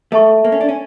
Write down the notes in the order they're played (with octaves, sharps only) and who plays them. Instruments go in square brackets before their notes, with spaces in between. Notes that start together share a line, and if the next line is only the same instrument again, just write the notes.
[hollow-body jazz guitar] A3 [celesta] A4 E5 A5 C#6
[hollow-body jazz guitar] A#3
C#4
D4
C#4